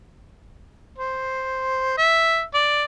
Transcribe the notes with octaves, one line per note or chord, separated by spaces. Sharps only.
C5
E5
D5